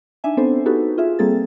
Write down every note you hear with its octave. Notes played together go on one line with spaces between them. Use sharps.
D4 D#4 E5 G#5
B3 C4 D4 A4 C5
B3 D#4 F#4 G4 A4 B4
F4 G#4 E5
G3 A#3 C4 G#4 A4 A6